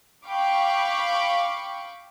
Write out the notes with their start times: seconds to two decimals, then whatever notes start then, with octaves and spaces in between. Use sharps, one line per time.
0.26 F5 G5 B5 C#6 D6